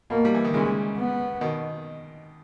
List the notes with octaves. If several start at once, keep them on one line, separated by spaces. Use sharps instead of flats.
B2 A#3
G3
E3
D#3
A#2 C#3 G#3
B3
B2 D#3